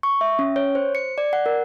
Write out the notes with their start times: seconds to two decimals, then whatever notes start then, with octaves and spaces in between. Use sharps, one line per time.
0.03 C#6
0.21 E5
0.39 C#4
0.56 C#5
0.75 C5
0.95 C#7
1.18 D5
1.33 F#5
1.46 A#4